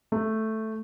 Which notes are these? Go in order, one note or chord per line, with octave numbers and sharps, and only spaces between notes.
A3